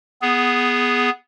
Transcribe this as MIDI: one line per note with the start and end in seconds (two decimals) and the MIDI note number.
0.22 1.10 59
0.22 1.10 68